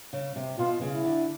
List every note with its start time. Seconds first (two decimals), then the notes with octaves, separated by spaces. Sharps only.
0.13 C#3
0.36 C3
0.59 B2 F4
0.82 C#3
0.93 E4
1.04 D3